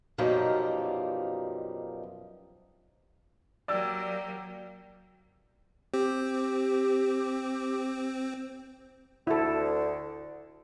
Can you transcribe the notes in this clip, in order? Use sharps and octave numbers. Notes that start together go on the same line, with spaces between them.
F#2 B2 F3 G3 A#3 D#4
F#3 A#3 G4 D5 E6
C4 G4
D2 D3 E4 A4